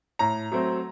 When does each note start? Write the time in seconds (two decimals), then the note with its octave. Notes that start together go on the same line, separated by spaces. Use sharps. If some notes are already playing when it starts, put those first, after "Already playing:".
0.19 A2 A#5
0.52 F#3 A3 C4